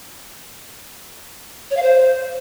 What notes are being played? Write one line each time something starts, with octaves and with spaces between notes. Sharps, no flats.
C#5
F5
C5